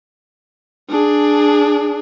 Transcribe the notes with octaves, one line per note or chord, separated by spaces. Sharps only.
D4 G#4